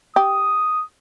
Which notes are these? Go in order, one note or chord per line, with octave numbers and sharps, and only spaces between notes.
G4 D#6